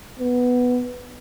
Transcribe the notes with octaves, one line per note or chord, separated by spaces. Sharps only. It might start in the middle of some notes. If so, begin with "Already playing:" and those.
B3